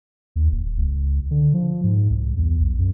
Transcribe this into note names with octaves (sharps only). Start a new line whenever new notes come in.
D#2
D1
C#2
D3
F3
G#2
C2
E2
B1
F#2